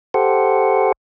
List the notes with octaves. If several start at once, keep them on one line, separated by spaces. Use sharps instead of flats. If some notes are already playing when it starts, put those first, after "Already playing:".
G4 A4 C5 F#5